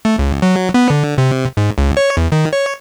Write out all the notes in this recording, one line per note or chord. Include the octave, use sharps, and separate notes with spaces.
A3
C#2
F#3
B3
D3
C3
G#2
C#2
C#5
E2
D#3
C#5